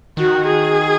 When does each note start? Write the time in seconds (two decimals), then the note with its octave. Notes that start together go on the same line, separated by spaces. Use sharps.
0.17 D#3 F#4
0.46 G#4